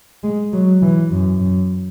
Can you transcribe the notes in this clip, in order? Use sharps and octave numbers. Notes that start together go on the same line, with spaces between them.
G#3
F#3
E3
F#2
F#2